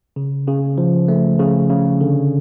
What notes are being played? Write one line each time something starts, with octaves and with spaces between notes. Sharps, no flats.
C#3
C#3
F3
A3
C#3
C#3
D3